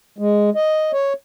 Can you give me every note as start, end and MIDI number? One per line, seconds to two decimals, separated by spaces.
0.19 0.50 56
0.55 0.92 75
0.93 1.13 73